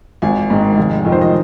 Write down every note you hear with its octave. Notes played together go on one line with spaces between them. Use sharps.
G#1 G#5
G#2 D#3
F1
F2 D#3
C5
D#5